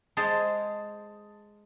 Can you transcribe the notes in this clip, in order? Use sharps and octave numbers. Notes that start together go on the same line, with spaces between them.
G#3 G#4 C5 A5 D#6 A6